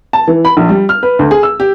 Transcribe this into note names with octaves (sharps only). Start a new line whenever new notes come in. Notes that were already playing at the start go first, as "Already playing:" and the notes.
A5
E3
B5
A#1
G3
F6
B4
D2
G#4
E6
G4